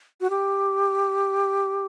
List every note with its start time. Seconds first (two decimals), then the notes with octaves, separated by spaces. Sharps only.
0.21 F#4
0.30 G4